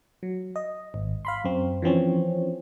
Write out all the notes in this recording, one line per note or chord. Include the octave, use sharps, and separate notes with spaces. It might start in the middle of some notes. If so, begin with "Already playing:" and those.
F#3
D#5
G#1
F5 B5 C6
F#2 C4
E3 F3 C4 C#4